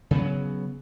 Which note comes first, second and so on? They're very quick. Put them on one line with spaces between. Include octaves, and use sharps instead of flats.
C#3 B3 F#3